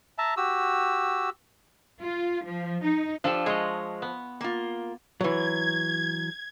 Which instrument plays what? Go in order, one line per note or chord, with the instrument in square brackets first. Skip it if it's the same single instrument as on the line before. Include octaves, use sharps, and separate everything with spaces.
[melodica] E5 A5 A#5
F#4 G4 E6
[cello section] F4
F3
D#4
[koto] F3 F4 A4 [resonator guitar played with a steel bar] D4 G4
[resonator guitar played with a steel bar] G#3 [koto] C#5 D#5
[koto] B3
[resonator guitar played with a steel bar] A#3 F4
[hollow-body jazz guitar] E3 F#3 [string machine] G#6